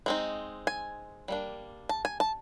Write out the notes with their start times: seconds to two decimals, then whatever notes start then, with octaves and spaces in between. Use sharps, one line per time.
0.06 G#3 C4 D#4
0.67 G#5
1.28 G3 A#3 D4
1.89 A5
2.05 G#5
2.20 A5